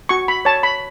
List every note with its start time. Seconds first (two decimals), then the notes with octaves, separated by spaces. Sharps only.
0.09 F#4 C#6
0.28 B5
0.45 C#5 A5
0.63 B5